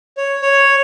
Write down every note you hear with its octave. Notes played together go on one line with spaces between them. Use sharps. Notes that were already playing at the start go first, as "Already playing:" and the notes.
C#5
C#5